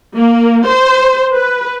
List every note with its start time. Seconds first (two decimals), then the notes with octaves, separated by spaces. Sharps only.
0.15 A#3
0.68 C5
1.35 B4